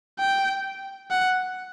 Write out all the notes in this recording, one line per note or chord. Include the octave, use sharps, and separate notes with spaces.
G5
F#5